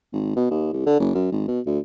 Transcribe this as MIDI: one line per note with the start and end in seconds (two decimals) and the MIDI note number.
0.13 0.33 32
0.36 0.47 47
0.51 0.69 39
0.73 0.82 36
0.86 0.99 50
1.00 1.13 30
1.14 1.27 42
1.32 1.45 32
1.48 1.60 47
1.66 1.79 38